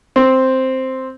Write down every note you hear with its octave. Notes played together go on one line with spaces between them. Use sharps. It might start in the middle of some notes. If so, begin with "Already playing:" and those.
C4